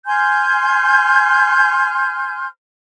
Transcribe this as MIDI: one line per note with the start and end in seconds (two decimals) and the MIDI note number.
0.06 2.47 80
0.06 2.47 84
0.06 2.47 89
0.06 2.47 91